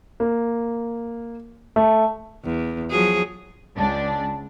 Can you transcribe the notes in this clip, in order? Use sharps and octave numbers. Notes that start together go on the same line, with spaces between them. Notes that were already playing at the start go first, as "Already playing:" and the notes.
A#3
A3
E2
F3 F#3 G#4
C#2 D4